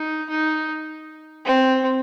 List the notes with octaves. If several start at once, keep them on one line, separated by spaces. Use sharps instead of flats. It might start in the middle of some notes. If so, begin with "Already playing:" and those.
Already playing: D#4
D#4
C4